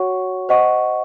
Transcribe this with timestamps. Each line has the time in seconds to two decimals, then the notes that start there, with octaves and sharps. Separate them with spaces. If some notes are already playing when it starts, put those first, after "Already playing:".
Already playing: F#4 C#5 F#5 C#6
0.49 C5 D#5 F#5 C#6